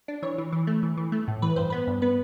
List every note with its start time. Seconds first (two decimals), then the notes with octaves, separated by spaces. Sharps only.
0.08 D4
0.22 E3 C#5
0.38 E3
0.52 E3
0.67 A3
0.83 E3
0.97 E3
1.12 A3
1.28 A2
1.42 E3 B4
1.56 G2 C5
1.70 B3 B4
1.87 G2
2.02 B3 B4